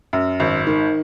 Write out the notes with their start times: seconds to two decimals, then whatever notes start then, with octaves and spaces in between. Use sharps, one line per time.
0.13 F#2
0.40 G#1
0.67 D#3